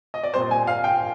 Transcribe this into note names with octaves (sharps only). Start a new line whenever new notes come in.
D#5
D5
A#2 G3 C4 C5
G#5
F5
G5